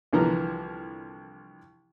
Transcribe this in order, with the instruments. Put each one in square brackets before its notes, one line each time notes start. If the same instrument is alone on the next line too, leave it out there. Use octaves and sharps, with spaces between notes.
[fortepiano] C2 D3 E3 F3 A#4 A#5